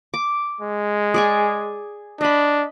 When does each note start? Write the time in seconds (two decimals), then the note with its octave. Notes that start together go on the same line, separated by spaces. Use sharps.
0.14 D6
0.61 G#3
1.14 G#4 D5 G#5
2.21 D4 D#5 B5